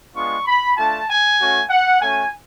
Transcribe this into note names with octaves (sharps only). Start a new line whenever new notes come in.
G#3 B3 D4 F4 C#6
B5
A3 D4 F4 A5
G#5
A3 C#4 F#4
F#5
A3 C#4 F#4 G#5